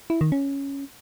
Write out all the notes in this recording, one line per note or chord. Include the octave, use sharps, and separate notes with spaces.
E4
D#3
C#4